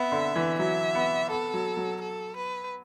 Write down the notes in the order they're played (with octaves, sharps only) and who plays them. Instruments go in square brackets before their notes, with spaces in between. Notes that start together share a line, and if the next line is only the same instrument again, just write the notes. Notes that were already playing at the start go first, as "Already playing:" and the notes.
Already playing: [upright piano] B3 [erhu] E5
[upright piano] D3
E3
[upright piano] F#3 [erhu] E5
[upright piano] B3
[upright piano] B3 [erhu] A4
[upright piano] F#3
F#3
[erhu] A4
B4